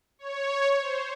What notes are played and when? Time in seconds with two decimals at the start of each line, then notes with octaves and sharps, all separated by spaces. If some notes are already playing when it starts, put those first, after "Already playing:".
0.19 C#5
0.80 C5